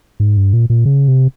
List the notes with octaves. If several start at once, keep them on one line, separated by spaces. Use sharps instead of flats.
G#2
G2
A#2
A#2
C#3
C3